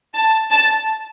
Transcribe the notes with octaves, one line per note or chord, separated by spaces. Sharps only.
A5
A5